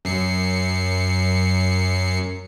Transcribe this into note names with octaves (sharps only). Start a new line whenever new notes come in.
F#2 C7 C#7